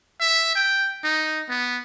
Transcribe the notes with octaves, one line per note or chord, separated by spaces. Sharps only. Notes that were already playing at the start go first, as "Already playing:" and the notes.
E5
G5
D#4
B3